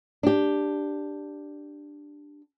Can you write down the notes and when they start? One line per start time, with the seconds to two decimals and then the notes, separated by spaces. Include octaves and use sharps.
0.23 D4 G4